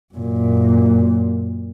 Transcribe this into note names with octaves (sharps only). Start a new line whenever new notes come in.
F#2 A#2